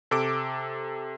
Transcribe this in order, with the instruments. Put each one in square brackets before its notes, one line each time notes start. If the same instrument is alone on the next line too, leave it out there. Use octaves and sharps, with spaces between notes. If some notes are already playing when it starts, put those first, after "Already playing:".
[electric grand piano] C3 A4 D6 D7